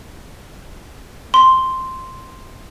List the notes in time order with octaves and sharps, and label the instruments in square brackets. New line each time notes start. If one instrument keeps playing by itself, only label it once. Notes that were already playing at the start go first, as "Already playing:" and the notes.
[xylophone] C6